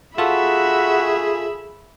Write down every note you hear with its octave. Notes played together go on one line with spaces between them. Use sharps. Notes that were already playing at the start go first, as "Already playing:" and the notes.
F4 F#4 G#4 A4 E5 B5